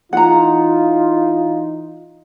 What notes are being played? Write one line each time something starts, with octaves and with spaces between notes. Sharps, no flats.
E3 D#4 F4 F#5 A#5